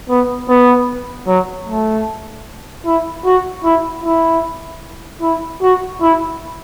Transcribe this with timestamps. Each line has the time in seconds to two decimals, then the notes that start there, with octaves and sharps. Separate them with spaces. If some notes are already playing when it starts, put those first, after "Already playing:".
0.09 B3
0.49 B3
1.27 F#3
1.67 A3
2.86 E4
3.25 F#4
3.64 E4
4.04 E4
5.22 E4
5.62 F#4
6.01 E4